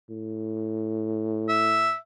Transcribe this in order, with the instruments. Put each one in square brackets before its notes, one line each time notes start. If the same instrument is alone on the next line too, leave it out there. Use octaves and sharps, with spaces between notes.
[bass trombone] A2
[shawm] E5